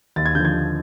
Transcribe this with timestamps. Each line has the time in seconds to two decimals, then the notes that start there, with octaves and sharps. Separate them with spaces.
0.16 D#2 A6
0.26 G#6
0.35 D3 F3 G6
0.45 G#6
0.54 D#2